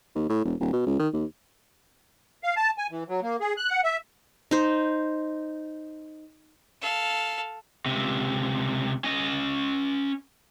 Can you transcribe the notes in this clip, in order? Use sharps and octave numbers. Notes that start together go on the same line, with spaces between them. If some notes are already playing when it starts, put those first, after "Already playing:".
D#2
A2
E1
D#1
B2
C#2
D#3
D#2
F5
A5
G#5
E3
F#3
A#3
G#4
F#6
F#5
E5
D#4 C5
A4 F5
C#2 C3
C#4 D#5